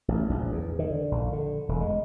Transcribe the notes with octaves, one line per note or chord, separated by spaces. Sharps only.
A1
A#1
E2
D#3
D3
A#1
D3
E1
G#3